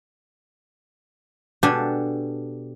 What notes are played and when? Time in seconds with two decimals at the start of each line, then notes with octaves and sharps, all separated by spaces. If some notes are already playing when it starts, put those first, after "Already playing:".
1.63 B2 D4 G4 A4 G#5